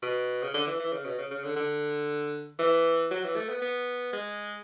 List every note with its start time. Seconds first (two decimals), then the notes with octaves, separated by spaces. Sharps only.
0.03 B2
0.43 C#3
0.54 D3
0.67 E3
0.80 E3
0.93 C#3
1.05 B2
1.18 C#3
1.31 C#3
1.44 D3
1.56 D3
2.59 E3
3.11 F#3
3.24 E3
3.36 A3
3.49 B3
3.62 B3
4.13 G#3